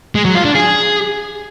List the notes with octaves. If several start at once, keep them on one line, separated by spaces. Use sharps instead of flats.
G#3
F#3
F4
D4
G#4